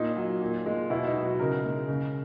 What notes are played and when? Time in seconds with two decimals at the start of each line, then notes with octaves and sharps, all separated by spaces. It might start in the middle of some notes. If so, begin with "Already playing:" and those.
Already playing: A#2 D#4
0.17 F#3
0.41 A#2
0.66 G#3
0.90 B2 E4
1.07 D#4
1.14 F#3
1.23 F#4
1.39 C#3 A#4
1.64 G#3
1.88 C#3